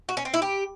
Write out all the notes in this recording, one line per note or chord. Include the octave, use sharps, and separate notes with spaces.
F#4
C#4
C4
E4
G4